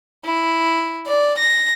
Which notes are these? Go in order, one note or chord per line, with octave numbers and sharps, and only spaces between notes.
E4
D5
A#6